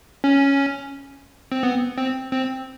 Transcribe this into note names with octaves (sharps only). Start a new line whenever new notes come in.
C#4
C4
B3
C4
C4